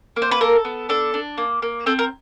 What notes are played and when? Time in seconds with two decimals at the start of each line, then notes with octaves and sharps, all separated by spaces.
0.16 A#3
0.22 C5
0.31 B4
0.41 A4 A#4
0.65 B3
0.89 D4 A4
1.14 D4
1.38 A#3
1.62 A#3
1.86 C4 A4
1.99 A#4